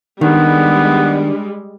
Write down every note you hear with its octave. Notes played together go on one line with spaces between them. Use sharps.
D#3 G3 G#3 B3 D4